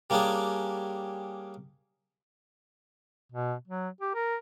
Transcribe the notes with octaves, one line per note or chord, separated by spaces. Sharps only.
G3 A#3 C#4 D4 G4 G#4
B2
F#3
G4
A#4